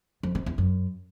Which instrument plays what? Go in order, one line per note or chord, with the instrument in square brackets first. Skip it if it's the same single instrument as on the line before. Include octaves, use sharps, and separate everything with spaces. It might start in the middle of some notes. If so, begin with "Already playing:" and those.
[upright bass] F2
C3
E2
F#2